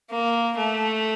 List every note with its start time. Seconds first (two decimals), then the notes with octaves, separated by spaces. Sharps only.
0.11 A#3
0.57 A3